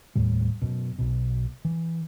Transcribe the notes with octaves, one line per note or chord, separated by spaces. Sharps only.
F1 D#2 A2 G3
F#2 B2
B1 B2
E3